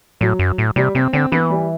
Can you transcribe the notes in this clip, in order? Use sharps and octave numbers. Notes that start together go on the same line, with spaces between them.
A2 F#3
F#2
A2
C3 G3
C3 C4
D3 C4
E3 B3
G3